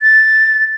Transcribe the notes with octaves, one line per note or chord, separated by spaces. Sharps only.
A6